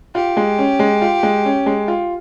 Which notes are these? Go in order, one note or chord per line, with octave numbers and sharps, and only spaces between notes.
F4 G4
G#3
C#4
G#3
F4
G#3
C#4
G#3
F4